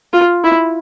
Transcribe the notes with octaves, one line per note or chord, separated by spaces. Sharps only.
F4
E4